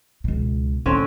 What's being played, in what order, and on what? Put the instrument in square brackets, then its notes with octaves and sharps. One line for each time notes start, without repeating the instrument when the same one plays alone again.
[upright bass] C#2 B2
[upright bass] G#2 A3 [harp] D3 C4 C#4